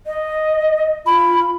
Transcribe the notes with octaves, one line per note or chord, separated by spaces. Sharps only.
D#5
F4 B5